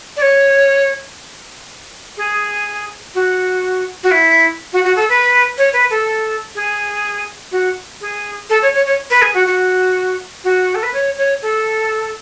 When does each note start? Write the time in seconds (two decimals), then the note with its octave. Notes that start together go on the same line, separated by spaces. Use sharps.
0.17 D5
0.22 C#5
2.17 G#4
3.15 F#4
4.03 F#4
4.11 E4
4.73 F#4
4.84 F#4
4.96 A4
5.09 B4
5.58 C#5
5.73 B4
5.90 A4
6.55 G#4
7.52 F#4
8.01 G#4
8.50 A4
8.62 C#5
8.74 C#5
8.86 C#5
9.10 B4
9.22 G#4
9.34 F#4
9.47 F#4
10.44 F#4
10.75 A4
10.83 B4
10.93 C#5
11.17 C#5
11.42 A4